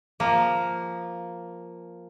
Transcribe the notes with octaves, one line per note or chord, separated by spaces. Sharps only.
F3 A#3